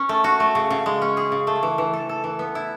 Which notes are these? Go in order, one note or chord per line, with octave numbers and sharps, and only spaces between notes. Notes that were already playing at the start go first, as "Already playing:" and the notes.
Already playing: C#4
A3
F#4
A3
C#3
C#3
G#3
C#4
G#4
C#3
A3
E3
E3
A4
A4
E3
B3
E4